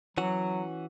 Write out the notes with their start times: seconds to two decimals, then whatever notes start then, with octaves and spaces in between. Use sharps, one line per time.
0.18 E3 F#3 C#4 F#4